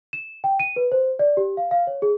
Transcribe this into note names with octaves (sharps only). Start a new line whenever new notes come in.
E7
G5
D#7
B4
C5
D5
G4
F5
F5
C#5
G#4